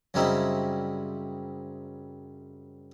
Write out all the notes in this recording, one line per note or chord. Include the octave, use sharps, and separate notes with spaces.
F#2 C#3 G3 C4 D#4 E4